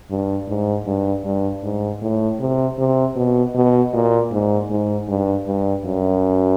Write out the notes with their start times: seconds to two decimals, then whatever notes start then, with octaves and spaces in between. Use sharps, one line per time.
0.10 G2
0.48 G#2
0.86 G2
1.24 G2
1.63 G#2
2.02 A2
2.40 C3
2.79 C3
3.16 B2
3.55 B2
3.93 A#2
4.32 G#2
4.70 G#2
5.08 G2
5.47 G2
5.85 F#2